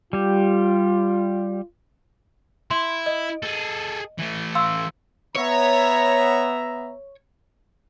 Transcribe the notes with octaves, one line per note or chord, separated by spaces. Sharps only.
G3 F4 G4
E4 C6
D#5
G#4 A4
E3 A3
F5 C6 E6
B3 C#5 E5 A#5